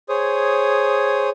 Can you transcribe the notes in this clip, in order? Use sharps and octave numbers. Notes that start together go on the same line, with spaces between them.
G#4 C5 C#5 D#6